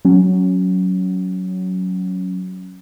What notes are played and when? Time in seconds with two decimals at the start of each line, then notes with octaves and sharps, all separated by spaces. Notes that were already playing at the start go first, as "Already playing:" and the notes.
0.05 F#3 C#4